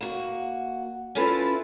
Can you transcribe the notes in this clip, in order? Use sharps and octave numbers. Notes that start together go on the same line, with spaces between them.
A#3 F#4
C#4 E4 F4 A4 B4